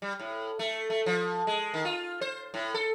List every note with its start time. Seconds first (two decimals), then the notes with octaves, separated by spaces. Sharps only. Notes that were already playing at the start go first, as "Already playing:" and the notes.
0.02 G3
0.20 A2
0.59 A3
0.90 A3
1.06 F3
1.47 G#3
1.74 D#3
1.85 F4
2.21 C5
2.54 A2
2.74 A4